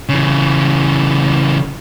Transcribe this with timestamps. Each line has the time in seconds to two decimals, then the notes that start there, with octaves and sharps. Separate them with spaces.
0.09 C#3 E3